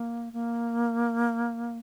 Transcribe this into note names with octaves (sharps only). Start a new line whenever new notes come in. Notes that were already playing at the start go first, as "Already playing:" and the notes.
Already playing: A#3
A#3